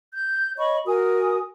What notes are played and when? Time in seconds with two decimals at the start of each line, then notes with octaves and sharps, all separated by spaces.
0.12 G6
0.58 C#5 D#5 B5 C#6
0.86 F#4 A#4 G#5 D#6